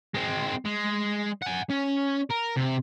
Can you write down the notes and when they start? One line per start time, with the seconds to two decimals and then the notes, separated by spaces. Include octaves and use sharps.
0.15 G#3 C4
0.65 G#3
1.42 F#5 G#5
1.70 C#4
2.31 A#4
2.57 C3